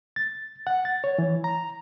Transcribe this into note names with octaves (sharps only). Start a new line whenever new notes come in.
A6
F#5
A6
C#5
E3
A#5